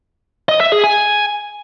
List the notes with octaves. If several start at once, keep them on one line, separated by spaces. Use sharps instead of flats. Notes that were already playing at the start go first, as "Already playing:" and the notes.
D#5
E5
G#4
G#5